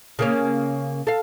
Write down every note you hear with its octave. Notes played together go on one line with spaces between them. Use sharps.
C#3 A#3 C#4
A4 F5